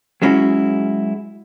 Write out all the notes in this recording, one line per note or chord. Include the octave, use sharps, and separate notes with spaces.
F#3 G#3 C#4 E4 F#4